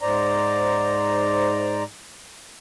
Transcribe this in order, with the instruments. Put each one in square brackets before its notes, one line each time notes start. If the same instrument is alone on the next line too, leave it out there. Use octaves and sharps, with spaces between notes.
[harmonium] G#2 C5 D5 A#5